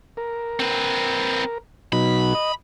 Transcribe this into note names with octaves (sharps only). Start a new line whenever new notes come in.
A#4
C4 B4
B2 F#3 D#4 B5
D#5